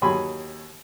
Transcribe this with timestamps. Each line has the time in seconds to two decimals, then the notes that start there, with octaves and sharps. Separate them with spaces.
0.02 D#2 F#3 G#4 C#5 G#5 B5